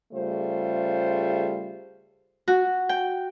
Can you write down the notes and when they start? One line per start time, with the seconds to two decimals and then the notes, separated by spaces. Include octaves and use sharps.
0.12 C#3 G3 A3 F4 G#4 C5
2.48 F#4
2.89 G5